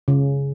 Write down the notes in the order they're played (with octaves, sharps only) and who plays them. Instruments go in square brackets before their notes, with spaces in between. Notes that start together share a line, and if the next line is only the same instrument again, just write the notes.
[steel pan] C#3